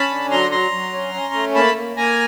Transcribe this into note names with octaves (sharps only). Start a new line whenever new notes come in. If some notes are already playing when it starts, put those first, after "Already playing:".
Already playing: C#4 A5 B5
D3
F#3 A#5 C6
F#3 A#5 C6
F#3
C#4
C#4
A3
A#3 A5 B5
A#3
A#3 G#5 A#5